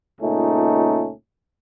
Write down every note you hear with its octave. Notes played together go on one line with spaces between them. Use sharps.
C#2 A#2 A3 C#4 D#4